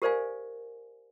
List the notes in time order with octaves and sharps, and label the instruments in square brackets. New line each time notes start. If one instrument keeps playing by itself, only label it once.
[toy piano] G4 A#4 C5 D5 F5 G#5